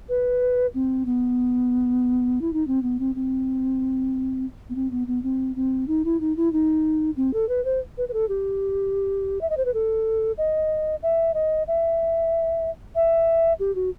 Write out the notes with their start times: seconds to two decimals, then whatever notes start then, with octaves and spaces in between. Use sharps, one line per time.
0.09 B4
0.74 C4
1.05 B3
2.41 E4
2.53 D#4
2.67 C4
2.83 B3
2.99 C4
3.15 C4
4.69 B3
4.75 C4
4.91 B3
5.07 B3
5.23 C4
5.56 C4
5.88 D#4
6.05 E4
6.20 D#4
6.37 E4
6.52 D#4
7.16 C4
7.33 A4
7.49 B4
7.65 C5
7.98 B4
8.08 B4
8.13 A4
8.29 G4
9.41 E5
9.50 D#5
9.57 C5
9.65 B4
9.74 A4
10.38 D#5
11.03 E5
11.34 D#5
11.67 E5
12.95 E5
13.59 G4
13.75 F#4